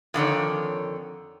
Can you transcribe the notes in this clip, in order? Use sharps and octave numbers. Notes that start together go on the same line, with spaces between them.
F2 D3 D#3 C#5